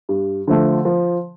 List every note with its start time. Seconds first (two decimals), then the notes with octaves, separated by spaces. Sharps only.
0.09 G2
0.48 D3 F3 A3
0.85 F3